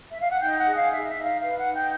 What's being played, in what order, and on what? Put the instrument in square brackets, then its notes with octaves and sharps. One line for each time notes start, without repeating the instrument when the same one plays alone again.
[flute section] E5
F5
F#5
D#4 G5
F#5
G#4
F5
D#4 E5
E5
D#4
F5
B4 F5
F#5
D#4
G5